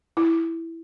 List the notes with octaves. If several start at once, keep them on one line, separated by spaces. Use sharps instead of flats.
E4